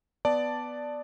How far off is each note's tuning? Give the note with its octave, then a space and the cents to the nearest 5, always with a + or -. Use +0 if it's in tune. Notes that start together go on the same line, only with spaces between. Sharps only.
B3 +5 D5 +0 A5 +0